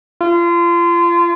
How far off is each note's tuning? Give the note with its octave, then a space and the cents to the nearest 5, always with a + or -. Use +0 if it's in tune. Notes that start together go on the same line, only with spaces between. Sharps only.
F4 -30